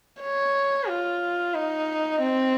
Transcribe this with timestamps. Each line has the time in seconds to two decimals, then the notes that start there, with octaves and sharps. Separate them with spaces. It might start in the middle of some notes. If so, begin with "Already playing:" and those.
0.21 C#5
0.88 F4
1.54 D#4
2.21 C4